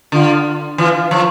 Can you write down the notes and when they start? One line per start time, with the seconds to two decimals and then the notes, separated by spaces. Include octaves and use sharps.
0.12 D3 F4
0.78 E3 F4
1.11 F3